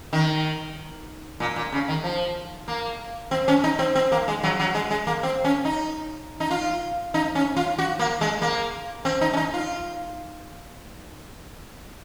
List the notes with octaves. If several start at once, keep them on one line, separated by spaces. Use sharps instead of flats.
D#3
A#2
A#2
C#3
D#3
F3
A#3
C4
C#4
D#4
C4
C4
A#3
G#3
F#3
F#3
G#3
G#3
A#3
C4
C#4
D#4
D#4
F4
D#4
C#4
F4
F#4
A#3
G#3
A#3
C4
D#4
C#4
D#4
F4